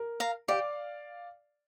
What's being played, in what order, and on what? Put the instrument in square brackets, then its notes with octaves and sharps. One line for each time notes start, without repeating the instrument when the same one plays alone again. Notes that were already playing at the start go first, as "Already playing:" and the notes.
Already playing: [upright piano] A#4
[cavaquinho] F5 A#5
[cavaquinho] G4 [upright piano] D5 F5